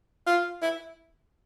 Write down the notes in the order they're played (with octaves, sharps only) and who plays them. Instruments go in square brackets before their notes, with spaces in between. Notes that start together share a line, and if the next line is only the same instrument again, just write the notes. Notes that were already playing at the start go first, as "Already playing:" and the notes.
[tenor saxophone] F4
E4